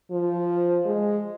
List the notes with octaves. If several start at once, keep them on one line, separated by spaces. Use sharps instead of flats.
F3
G#3